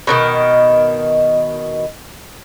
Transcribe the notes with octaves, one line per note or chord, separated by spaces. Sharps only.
B2 D3 D#3